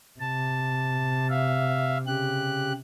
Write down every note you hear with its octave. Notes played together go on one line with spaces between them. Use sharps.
C3 A5
E5 F5
C#3 G4 F#6